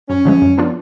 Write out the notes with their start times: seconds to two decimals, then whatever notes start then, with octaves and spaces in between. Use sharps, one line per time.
0.09 F#2 C#4
0.25 D3 F3 G#3
0.42 F#2
0.58 F3 B3 D4 F4